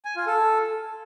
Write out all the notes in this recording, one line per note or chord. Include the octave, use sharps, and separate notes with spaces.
G#5
F4
A4